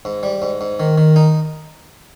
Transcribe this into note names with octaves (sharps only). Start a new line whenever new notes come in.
G#2
G3
G#2
G#2
D#3
D#3
D#4